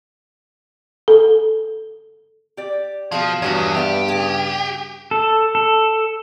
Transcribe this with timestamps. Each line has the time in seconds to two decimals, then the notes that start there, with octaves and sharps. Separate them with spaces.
1.08 A4
2.57 G4 D5
3.12 B2 F3 G#4 F5
3.42 E2 G2 F3 F#4 C#5
3.75 G3 B3 G4 E5
4.08 C#3 G#4
5.11 A4
5.55 A4